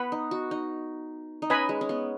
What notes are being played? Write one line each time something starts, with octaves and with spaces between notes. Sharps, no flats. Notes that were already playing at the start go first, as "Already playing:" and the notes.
Already playing: B3 B4 F#5 B5
D#4
F#4
D#4
D#4
C#4 B4 D#5 G#5 B5
G#3
C#4
B3